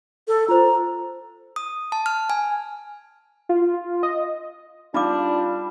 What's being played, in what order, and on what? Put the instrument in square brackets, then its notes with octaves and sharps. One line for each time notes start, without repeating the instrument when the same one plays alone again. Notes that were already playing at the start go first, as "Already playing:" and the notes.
[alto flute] A4
[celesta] F4 C5 [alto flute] A#5
[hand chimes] D#6
A5
F6
G#5
[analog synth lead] F4
D#5
[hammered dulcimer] G3 [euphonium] D4 [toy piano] D#4 F5 D6 [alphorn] F4